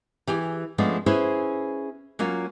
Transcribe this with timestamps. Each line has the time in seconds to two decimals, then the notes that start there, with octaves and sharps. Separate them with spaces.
0.27 E3 G4 G#4 G#5
0.78 F3 G#3 A3 B3 C#4 D4
1.06 C#4 E4 G#4 B4 C5
2.19 F#3 A#3 C#4 F4